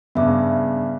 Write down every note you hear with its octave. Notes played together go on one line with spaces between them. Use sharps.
G2 C#3 B3 E5 D6